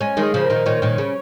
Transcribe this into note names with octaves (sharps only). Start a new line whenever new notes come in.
G#3 C#4 G#5
D#3 G#3
G#4
C#3 F3
A#4
A#2 D#3
A#2 D#3 C#5
A#2 D#3
C#3